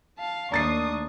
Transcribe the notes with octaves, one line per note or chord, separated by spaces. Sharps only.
F5 A5
D#2 A3 D4 A#5 C#6 D#6 A6 C7